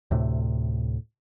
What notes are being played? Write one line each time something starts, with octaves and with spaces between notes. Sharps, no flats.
D2 A2 C3 A3